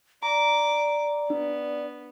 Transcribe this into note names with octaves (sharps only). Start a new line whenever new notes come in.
D5 A#5 D6
B3 D4